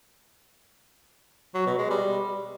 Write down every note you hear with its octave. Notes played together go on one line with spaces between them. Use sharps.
F#3
B2
G#3
G3